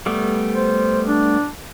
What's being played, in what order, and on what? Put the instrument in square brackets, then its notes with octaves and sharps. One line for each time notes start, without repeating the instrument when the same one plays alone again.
[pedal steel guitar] G3 A3 B3
[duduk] C5
D4